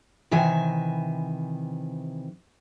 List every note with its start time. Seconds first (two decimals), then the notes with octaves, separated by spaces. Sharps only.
0.31 C3 D#3 E3 E5 G#5